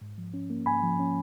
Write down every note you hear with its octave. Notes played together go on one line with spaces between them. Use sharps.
G#2
F3
C#4
A#3
G#2 G#5 B5
F3
C#4